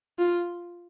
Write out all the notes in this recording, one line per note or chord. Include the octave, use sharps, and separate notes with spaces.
F4